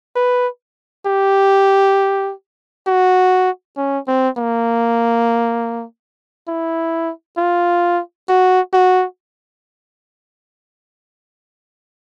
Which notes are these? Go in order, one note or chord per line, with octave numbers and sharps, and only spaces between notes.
B4
G4
F#4
C#4
C4
A#3
E4
F4
F#4
F#4